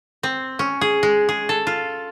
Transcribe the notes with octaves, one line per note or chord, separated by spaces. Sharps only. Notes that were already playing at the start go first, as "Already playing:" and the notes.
C4
C#4
G#4
G#3
G#4
A4
F4